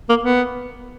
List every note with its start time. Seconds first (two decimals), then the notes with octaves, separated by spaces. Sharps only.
0.09 A#3
0.23 B3